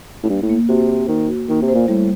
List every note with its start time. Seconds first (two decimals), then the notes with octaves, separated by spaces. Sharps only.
0.23 A2
0.29 G2 A#3
0.42 A2
0.49 A#3
0.69 C3 F#4
0.89 C5
1.08 D#3 A#3
1.28 F#4
1.48 D#3 A#3
1.62 C3
1.68 C5
1.75 A#2
1.88 A2 G3